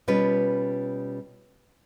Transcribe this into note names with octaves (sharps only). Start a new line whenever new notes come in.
B2 G3 C#4 F4 B4